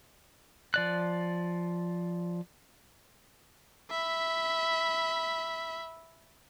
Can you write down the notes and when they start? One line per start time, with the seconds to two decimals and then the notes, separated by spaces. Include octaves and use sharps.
0.74 F3 D5 F#6
3.90 E5 B5